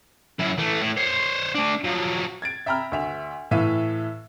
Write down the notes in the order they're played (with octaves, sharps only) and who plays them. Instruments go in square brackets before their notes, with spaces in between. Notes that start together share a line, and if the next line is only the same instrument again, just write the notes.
[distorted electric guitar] F#2 E4
E3 A3
A2
C5 C#5
A3 D4
F3 F#3
[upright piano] G#6 A6 D7
E5 G5 A#5 B5 E6 F6
D2 E5 F7
A2 E3 E5 F5 D#7